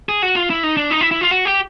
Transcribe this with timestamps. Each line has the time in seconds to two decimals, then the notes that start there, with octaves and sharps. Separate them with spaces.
0.09 G#4
0.22 F#4
0.36 F4
0.50 E4
0.63 D#4
0.77 D4
0.91 D#4
1.01 E4
1.11 E4
1.21 F4
1.31 F#4
1.45 G4